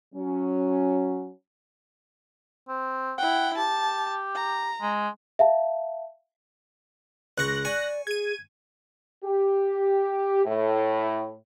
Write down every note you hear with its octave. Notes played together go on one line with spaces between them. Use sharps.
F#3 C#4
C4
E4 F#5 G5
G4 A5
A#5
G#3
E5 F5 A5
C#2 C#6 F#6 A#6
D5 G#5 C#6
G#4 G#6 D#7
G4
A2